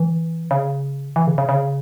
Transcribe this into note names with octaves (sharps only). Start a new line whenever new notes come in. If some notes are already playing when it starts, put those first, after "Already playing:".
Already playing: E3
C#3
E3
C#3
C#3
C#3